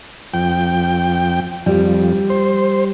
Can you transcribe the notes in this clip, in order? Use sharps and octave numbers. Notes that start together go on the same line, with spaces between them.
F2 G5
F2 G3
C5